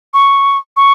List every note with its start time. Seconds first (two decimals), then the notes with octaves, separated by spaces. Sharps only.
0.14 C#6
0.77 C#6